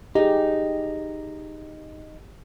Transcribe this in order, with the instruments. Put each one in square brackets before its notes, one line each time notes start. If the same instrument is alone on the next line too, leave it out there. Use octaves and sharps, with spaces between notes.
[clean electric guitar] D#4 [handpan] G4 G#4